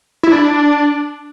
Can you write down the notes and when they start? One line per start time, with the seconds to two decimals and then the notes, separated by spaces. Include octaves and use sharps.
0.23 E4
0.32 D4